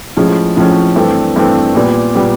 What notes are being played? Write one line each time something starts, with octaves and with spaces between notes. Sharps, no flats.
A2 F3 G#3 C#4
A2 F3 G#3 C#4
G2 E3 A3 C4
G2 E3 A3 C4
A#2 G3 B3
A#2 G3 B3